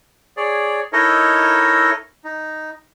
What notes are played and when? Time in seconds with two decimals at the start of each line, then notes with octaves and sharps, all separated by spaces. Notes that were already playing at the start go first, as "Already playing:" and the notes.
0.37 G#4 C#5 D5
0.93 D#4 E4 A4 A#4 C#5 D#5
2.24 D#4